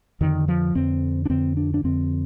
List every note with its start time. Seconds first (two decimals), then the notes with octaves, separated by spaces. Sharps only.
0.21 F2 D3 D#3
0.48 F3
0.75 F2 D3 C4
1.25 D4
1.30 F2 D3 C4
1.57 D4
1.74 D4
1.84 F2 D3 C4